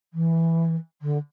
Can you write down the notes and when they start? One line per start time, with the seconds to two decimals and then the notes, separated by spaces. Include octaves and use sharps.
0.13 E3
1.01 D3